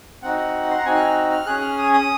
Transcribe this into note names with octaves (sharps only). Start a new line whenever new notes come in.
C4 D#4 F#4 F#5
C6
A#5
C4 D#4 F#4 G#5
F#6
F6
F6
C#4 G#4 F#6
F6
D#6
D#6